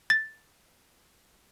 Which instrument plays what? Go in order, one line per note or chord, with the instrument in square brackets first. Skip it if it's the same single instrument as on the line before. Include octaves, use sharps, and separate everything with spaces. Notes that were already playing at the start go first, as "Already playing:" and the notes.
[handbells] A6